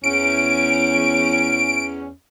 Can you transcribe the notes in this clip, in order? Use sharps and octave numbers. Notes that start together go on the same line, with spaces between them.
E2 C#4 D7